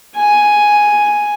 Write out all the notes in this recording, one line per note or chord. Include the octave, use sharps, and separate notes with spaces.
G#5